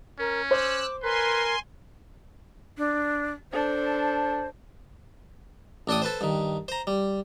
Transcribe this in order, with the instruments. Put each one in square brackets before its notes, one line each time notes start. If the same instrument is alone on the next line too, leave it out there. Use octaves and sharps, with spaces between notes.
[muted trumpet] C#4 [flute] A#4
[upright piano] C5 [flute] D6 [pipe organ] E6 F#6
[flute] A#4 [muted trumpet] B4 [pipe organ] G#5 C6
[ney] D4
[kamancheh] D4 A4 [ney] C5
[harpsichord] A1 D4 A4 G5 D#6
A4 B4 C5
G2 D#3
C5 A#5
G3